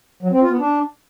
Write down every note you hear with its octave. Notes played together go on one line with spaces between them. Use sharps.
F#3
C4
F4
B3
D4